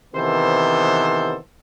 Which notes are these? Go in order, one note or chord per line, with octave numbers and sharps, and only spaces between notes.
C3 D#3 E3 B3 A4 C5